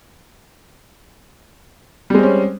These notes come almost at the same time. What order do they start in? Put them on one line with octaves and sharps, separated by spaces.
G3 G#3 C4 C#4